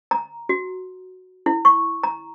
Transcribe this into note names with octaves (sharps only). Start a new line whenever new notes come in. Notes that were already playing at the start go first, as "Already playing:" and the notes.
A#5
F#4
E4
C#6
A#5